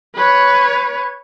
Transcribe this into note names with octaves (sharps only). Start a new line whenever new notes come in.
B4 C#5